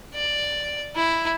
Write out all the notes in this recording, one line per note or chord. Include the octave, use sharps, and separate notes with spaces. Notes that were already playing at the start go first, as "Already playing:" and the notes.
D5
E4